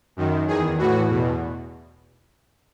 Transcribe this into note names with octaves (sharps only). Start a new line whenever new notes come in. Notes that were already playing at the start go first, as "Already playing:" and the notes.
F#2 D#3
E2 D#3 G#4
A2 E3 F#4
E2 B2